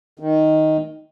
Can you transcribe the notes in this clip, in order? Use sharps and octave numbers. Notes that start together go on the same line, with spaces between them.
D#3